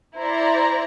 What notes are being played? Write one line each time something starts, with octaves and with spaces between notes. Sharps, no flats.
E4 C5 D5 A#5